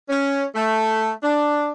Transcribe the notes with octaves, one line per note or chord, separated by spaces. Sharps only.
C#4
A3
D4